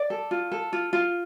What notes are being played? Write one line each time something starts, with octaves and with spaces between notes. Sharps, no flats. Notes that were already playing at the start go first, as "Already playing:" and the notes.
Already playing: D5
A4
F4
A4
F4
F4